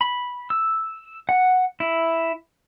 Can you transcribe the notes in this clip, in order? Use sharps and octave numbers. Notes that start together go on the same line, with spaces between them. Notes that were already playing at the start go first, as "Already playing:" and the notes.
B5
E6
F#5
E4